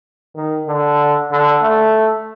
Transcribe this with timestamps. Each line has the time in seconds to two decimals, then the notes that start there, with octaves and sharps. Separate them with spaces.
0.36 D#3
0.67 D3
1.31 D3
1.62 A3